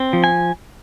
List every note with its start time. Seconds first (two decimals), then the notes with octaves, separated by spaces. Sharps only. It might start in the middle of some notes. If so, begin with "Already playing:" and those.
Already playing: C4
0.13 F3
0.24 G#5